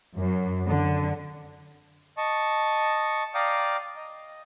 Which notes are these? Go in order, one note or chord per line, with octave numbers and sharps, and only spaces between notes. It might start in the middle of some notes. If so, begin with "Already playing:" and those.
F#2
D3
D#5 A5 C#6
D5 F5 G5 A#5 D6 D#6
D#5